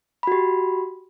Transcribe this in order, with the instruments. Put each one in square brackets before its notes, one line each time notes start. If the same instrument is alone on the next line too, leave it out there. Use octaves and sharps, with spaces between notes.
[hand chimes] B5
F#4
G4